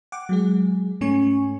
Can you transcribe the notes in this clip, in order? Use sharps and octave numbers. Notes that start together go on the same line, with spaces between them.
F#5 G5 D6
F#3 G#3 G#4
G#2 A3 C#4 G#5 C#6